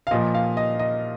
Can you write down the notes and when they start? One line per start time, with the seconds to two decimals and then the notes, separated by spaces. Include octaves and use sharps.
0.07 F5
0.11 A#2 F3 D#5
0.34 F5
0.57 D#5
0.79 D#5